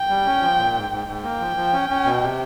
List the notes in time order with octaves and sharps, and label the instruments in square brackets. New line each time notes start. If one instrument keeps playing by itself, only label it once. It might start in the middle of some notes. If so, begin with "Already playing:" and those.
Already playing: [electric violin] G5
[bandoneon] G3
C#4
F3
A#2
G#2
G#2
G#2
[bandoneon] A#3 [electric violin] G5
[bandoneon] F3
F3
C#4
C#4
B2
C3